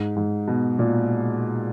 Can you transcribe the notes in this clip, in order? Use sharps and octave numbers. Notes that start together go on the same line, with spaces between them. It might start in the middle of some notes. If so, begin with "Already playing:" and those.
Already playing: G#2
G#2
B2
A#2